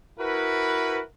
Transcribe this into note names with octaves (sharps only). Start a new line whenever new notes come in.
E4 F#4 A#4 B4